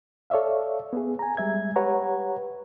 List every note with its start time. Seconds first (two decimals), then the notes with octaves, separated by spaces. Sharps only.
0.30 A4 C#5 D5 E5 F5
0.93 B3 G#4
1.19 G#5 A#5
1.37 G3 G#3 E5 G#6
1.76 G4 B4 C#5 F#5 A#5